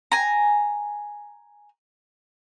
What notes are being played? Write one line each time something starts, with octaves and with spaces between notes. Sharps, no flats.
G#5 A#5